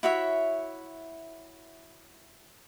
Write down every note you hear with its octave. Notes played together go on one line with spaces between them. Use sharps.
E4 F#4 C#5 E5